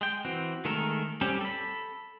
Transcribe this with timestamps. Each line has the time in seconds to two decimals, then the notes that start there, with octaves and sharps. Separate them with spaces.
0.01 G#3 G5
0.25 E3 C4 F#4
0.65 D#3 G#3 A3 A4 A#4
1.21 G3 C4 C#4 G4
1.41 A4 B5